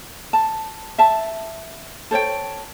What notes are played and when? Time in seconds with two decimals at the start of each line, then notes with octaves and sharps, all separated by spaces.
0.33 A5
0.98 E5 A5
2.11 A4 C5 C#5 G5